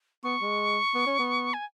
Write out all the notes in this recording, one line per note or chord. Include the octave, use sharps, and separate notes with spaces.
B3 C#6
G#3
B3
C#4
B3
G#5